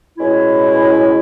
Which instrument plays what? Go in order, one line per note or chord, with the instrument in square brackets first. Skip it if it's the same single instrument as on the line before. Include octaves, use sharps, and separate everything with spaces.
[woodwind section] B2 G#3 C#4 E4